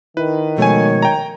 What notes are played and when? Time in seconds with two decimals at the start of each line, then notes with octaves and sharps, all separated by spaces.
0.17 D#3 E4 B4
0.58 B2 F3 G#3 A3 C#5 G#5
1.02 G5 A#5